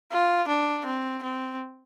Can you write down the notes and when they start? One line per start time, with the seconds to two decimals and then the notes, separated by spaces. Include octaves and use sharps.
0.12 F4
0.49 D4
0.86 C4
1.23 C4